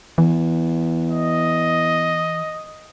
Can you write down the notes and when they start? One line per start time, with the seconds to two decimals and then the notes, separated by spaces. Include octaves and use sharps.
0.18 E2 E3
1.11 D#5